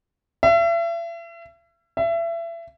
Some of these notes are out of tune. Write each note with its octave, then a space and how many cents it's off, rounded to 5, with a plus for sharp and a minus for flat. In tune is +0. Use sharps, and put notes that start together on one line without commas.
E5 +40
E5 +30